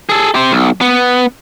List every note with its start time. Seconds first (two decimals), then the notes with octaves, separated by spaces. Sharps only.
0.09 G#4 A4
0.35 G4 C5
0.51 B1
0.81 B3